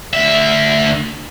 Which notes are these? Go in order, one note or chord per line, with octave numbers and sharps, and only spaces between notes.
D2 E5